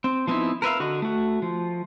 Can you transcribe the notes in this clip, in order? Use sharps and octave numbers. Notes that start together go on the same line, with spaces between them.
C4
F3 B3 C4 D#4 E4
A#4 B4 E5 F5
D3 F#4 D#5
A3 F#4
F3